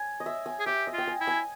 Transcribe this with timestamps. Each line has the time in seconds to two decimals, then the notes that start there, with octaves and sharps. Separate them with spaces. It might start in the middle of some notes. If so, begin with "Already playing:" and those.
Already playing: G#5
0.20 D#5
0.26 E5
0.46 G#5
0.60 G#4
0.66 G4 E5
0.87 D#5
0.93 F4
0.98 G5
1.07 G#5
1.21 E4
1.27 G#5